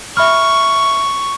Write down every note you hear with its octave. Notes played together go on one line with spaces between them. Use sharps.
E5 B5 C#6 F6